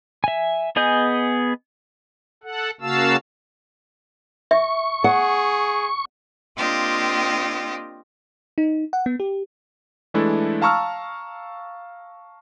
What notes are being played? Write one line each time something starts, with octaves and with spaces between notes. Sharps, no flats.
E5 G#5
B3 G#4 D#5 G#5 G6
A4 F#5
C#3 A#3 F#4 F5 A5 E6
E5 C#6
G#4 F#5
A#3 C4 D4 F4 G4 D#5
D#4
F#5
B3
G4
E3 G#3 A3 D4 E4 A4
F5 A5 A#5 C#6 E6 F6